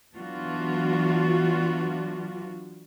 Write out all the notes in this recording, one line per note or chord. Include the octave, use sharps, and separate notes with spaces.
E3 F#3 B3 D4 F4 F#4